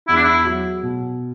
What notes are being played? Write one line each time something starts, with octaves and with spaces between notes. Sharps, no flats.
E2 E4
D4
E4
F#3
B2